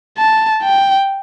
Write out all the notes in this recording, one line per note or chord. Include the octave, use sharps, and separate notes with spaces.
A5
G5